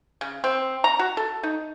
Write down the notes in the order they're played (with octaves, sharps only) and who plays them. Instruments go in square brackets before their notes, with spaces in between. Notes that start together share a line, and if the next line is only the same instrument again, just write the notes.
[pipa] C#3
C4
A#5
F#4
A4
D#4